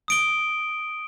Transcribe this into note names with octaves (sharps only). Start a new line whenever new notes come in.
D#6 D7 G7